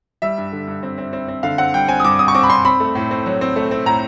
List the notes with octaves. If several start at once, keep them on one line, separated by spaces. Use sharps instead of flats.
G3 E5
G2
D3
G2
C4
C4
C4
C4
D3 F5
C4 F#5
G3 G5
C4 G#5
D#6
G2 D6
C4 D#6
C#6
C4 D6
B5
C4 C6
C4 B5
A3
A2
C4
F#3
C4
A3
C4
A2 A#5